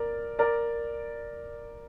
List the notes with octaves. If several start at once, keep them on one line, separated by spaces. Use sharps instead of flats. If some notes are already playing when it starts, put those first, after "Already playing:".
Already playing: A#4 D5
A#4 D5